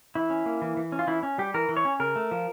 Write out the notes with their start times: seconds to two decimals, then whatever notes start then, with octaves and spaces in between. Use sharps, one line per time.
0.15 E3 E4
0.30 C#4
0.46 A#3
0.62 E3
0.77 E3
0.92 C#4
0.99 F4
1.07 E3 E4
1.23 C#4
1.38 G3 G4
1.54 E3 A#4
1.69 E3
1.77 C#5
1.85 C#4
2.00 C#3 A#4
2.16 A3
2.31 F3